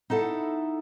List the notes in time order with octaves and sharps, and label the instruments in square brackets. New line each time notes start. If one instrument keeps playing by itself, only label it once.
[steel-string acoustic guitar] D#4 E4 A4 F#5